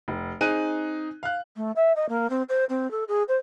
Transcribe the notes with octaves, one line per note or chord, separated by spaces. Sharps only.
F1
C4 D#4 G#4 F#6 D#7
F5 F#6
A3
E5
D#5
A#3
C4
C5
C4
A4
G#4
C5